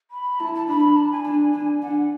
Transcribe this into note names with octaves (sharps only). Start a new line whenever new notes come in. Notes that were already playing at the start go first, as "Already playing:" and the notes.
B5
E4 A5
A5
D4 B5
A5
G#5
D4
D4
D4 F#5